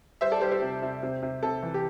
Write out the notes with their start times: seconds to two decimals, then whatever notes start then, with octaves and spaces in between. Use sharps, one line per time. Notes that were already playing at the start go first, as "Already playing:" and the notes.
0.21 G3 C5 E5
0.32 A4 D5
0.41 G3 G4 C5
0.52 G4 C5
0.62 C3
0.82 C3
1.03 C3
1.22 C3
1.43 C3 A4
1.63 E3
1.74 G4